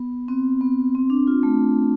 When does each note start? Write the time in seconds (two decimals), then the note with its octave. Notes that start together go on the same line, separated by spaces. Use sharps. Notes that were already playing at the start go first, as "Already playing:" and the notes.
Already playing: B3
0.28 C4
0.61 B3
0.95 C4
1.10 D4
1.27 F4
1.43 A3